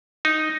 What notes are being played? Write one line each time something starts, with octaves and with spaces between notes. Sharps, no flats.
D#4